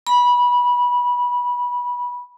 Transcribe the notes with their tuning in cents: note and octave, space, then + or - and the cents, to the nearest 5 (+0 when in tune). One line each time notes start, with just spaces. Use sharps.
B5 -20